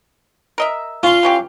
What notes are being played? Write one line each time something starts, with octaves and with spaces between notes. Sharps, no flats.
A#4 D#5 E5
C#4 F4 F5 C6
E3 C#4 G4